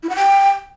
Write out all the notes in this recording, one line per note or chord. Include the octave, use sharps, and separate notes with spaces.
E4
F#5
G5